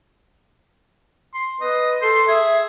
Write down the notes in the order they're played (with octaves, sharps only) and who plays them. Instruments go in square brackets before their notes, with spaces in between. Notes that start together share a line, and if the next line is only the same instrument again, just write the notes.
[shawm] C6
[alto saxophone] B4 [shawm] D#5
[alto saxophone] A4 [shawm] C6
[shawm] G#4 [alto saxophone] E5